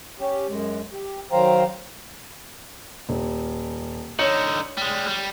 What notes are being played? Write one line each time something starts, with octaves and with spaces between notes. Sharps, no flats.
C#4 G4
F#2 G#3
G4
D#3 F#3 C5 F5 G5 A#5
D#1
D3 D#4 C#5 C#7 F#7
G3 G#3
G3